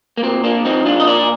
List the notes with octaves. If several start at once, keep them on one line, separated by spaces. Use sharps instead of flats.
A#3
A#2 C4
A#3 D4
F3 C4 D#4
D4 F4
D#5
A#2 A#4 D5